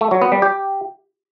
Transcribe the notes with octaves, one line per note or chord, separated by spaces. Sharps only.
A3
F#3
B3
G3
G4